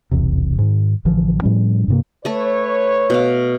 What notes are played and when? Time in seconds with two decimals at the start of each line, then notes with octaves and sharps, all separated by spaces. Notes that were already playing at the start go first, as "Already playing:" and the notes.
0.11 D#1 B1 E2 C3
0.59 G#2 D#3
1.05 A1 D3 E3 F3
1.42 A2 F3 G3 C#4
1.88 G2 C3 A#3
2.25 A3 A4 B4 C#5
3.10 B2 F5